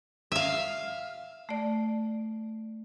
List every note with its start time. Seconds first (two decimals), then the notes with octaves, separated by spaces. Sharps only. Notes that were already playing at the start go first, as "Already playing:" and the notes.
0.32 E5 F5
1.49 A3 D5